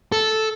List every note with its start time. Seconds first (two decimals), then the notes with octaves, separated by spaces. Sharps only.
0.12 A4